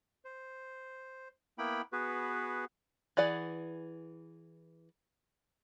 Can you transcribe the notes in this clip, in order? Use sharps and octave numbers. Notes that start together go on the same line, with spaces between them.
C5
A#3 B3 E4 G5 B5
B3 F#4 G#4 B4
E3 G#4 D5 F#5